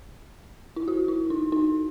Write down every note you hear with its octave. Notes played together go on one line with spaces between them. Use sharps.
E4
F#4
E4
D#4
D#4